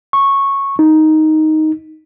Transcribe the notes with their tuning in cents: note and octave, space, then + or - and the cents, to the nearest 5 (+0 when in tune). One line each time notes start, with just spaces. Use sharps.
C#6 -10
D#4 +5